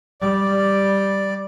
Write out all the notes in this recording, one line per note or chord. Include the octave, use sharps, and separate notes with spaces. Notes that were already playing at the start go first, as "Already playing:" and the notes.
G3 D5